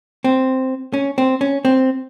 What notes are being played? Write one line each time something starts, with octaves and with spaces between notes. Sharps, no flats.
C4
C#4
C4
C#4
C4